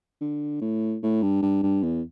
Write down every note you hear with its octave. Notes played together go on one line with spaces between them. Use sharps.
D3
A2
A2
G2
G2
G2
E2